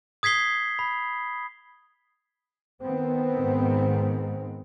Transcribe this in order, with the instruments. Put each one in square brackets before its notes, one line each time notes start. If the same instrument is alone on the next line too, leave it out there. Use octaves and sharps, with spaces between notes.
[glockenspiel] D#6 G#6 B6 C7 G7
B5
[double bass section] D#3 B3 C4
[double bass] G#2